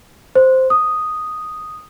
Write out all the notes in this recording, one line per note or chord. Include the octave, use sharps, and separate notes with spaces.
C5
D#6